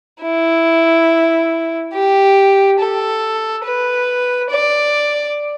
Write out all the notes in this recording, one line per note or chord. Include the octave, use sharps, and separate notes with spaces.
E4
G4
A4
B4
D5